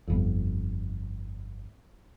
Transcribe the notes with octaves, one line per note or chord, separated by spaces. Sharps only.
G1 F2